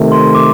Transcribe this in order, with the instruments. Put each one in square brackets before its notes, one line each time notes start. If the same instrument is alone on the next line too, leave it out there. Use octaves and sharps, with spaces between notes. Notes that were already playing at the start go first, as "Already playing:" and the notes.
Already playing: [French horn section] C3 D#3 A3
[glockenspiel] C6
D6